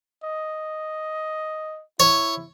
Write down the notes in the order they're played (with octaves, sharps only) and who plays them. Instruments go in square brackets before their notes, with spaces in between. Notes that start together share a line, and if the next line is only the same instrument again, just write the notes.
[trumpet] D#5
[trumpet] E4 [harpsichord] C#5